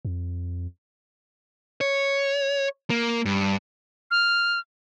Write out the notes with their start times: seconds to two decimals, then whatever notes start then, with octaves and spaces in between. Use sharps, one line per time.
0.05 F2
1.81 C#5
2.90 A#3
3.25 G2
4.11 F6